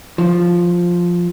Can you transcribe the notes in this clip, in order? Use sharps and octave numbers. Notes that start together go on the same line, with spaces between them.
F3